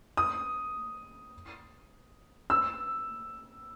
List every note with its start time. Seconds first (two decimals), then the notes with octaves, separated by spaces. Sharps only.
0.17 D#6
2.50 E6